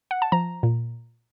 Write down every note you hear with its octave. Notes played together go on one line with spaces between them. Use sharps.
F#5
A5
F3 A#5
A#2